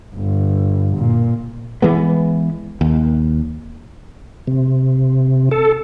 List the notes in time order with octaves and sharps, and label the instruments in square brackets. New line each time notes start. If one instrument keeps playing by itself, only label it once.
[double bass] G1
A#2
[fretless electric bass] E3 G#3 B3
D#2
[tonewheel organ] C3
A4